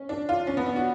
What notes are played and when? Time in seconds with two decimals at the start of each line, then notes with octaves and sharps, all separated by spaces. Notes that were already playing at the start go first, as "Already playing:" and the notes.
Already playing: C#4
0.09 D4
0.29 F4
0.47 C#4
0.57 B3
0.66 D4
0.76 F#4